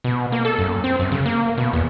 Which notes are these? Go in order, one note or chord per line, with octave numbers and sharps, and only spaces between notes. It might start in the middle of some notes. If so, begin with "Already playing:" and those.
B2
A#3
A4
F#2
C4
F#2
C#3
A#3
B2
E2